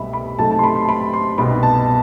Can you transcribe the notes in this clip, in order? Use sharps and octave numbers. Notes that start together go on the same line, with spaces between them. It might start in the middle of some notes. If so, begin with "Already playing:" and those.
Already playing: C2 B2 A3 C4 D#5 E5 B5
B5
C3 F#3 A3 D#4 A5
A5
C6
B5
C6
B5
C6
C2 B2 G3 B3 D#4 B5
A5